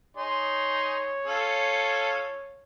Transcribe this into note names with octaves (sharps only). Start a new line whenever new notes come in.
D#4 G#4 C#5 C6
C#4 F4 A4